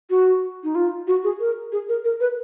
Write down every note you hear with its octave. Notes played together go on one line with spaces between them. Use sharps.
F#4
D#4
F4
F#4
G#4
A#4
G#4
A#4
A#4
B4